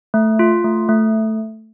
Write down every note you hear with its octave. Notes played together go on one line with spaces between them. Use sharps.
A3
F4
A3
A3